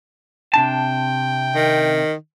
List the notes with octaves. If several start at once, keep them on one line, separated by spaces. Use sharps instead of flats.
C3 D4 G5 A5
D#3